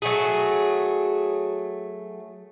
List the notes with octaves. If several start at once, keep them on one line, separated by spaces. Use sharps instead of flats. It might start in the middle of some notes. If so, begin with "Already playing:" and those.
F#3 A3 G#4